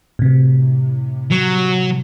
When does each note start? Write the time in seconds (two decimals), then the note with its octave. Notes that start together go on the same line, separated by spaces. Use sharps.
0.19 A2 C3
1.31 F#3